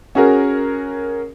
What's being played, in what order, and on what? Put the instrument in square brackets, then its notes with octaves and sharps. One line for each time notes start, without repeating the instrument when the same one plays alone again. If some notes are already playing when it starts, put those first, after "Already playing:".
[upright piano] C#4 F#4 G#4 A#4